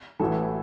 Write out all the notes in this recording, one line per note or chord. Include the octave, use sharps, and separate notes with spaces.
A1 A2 E3 F#4 A4